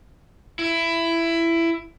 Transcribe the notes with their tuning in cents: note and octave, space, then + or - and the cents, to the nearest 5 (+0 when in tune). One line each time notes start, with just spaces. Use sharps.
E4 +15